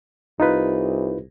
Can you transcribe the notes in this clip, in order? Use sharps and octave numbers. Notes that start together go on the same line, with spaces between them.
C2 D#4 F4 B4